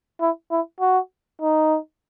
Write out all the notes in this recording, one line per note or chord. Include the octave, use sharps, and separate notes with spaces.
E4
E4
F#4
D#4